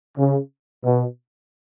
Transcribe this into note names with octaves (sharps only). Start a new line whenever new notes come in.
C#3
B2